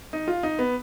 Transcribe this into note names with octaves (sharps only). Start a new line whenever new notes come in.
D#4
F4
D#4
B3